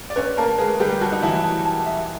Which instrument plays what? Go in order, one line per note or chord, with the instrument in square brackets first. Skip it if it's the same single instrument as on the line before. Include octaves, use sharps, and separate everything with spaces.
[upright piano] D5
[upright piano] C#4 C#5 [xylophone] B4
[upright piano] A#3 A#4 [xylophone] A5
[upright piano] G#3 G#4 [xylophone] B4
[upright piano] G3 G4 [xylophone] B4
[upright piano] F#3 F#4 [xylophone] A5
[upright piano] D#4
[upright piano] E3 E4 [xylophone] A5
[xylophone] A5
A5
E5